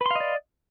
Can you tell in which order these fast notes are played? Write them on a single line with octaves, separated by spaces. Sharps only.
B4 C6 F5 D#5 D5